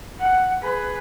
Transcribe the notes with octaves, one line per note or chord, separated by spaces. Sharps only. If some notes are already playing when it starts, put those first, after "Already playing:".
F#5
G#4 B4